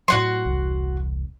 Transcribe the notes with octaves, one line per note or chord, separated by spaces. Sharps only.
A2 F#3 F#4 F#5 C6
E1 C2